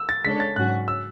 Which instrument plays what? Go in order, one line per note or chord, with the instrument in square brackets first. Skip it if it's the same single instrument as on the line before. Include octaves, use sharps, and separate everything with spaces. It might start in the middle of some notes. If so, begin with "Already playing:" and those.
Already playing: [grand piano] E6
A6
[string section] C#3 G#3 D4 A4 C#5 [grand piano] B6
[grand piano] A6
[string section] G#2 F#3 C#4 F#4 [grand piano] F#6
[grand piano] E6